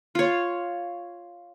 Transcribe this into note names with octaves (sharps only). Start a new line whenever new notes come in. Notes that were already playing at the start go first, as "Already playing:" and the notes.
F4 C#5